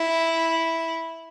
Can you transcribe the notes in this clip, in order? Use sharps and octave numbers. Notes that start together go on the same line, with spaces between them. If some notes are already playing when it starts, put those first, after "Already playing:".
Already playing: E4